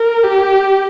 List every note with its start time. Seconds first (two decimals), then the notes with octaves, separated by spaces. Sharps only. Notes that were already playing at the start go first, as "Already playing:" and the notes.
Already playing: A#4
0.23 G4